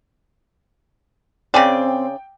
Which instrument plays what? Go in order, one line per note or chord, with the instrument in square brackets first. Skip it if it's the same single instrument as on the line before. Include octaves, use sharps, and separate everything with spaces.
[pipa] C#3 G#4 D5 [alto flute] C4 [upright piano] G5